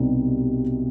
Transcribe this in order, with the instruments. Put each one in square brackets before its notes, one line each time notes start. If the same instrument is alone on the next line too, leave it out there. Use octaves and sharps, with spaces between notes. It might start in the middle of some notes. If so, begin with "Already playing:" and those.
Already playing: [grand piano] C2 B2 G3 C4 D#4